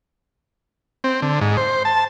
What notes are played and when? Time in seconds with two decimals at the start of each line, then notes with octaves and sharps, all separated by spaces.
1.04 C4
1.22 D3
1.41 G#2
1.57 C5
1.85 A5